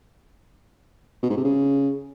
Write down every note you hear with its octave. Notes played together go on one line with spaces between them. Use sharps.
B2
G#2
C3
C#3